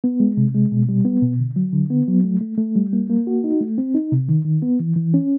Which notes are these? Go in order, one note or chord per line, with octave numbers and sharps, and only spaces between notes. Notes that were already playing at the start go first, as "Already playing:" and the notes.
B3
G#3
C3
G#3
B2
G3
B3
B2
D3
F#3
D3
B3
F#3
A3
A3
A3
G3
A#3
A#3
F#4
D#4
A3
C4
D#4
C3
D#3
D#3
B3
E3
E3
C#4